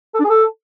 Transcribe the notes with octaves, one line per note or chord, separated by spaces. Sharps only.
A4
D4
G#4
A4